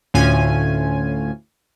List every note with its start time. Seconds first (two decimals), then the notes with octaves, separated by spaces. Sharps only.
0.14 D2 A2 C#4 F4 G#5